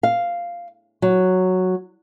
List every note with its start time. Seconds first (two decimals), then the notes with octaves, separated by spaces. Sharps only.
0.03 F5
1.02 F#3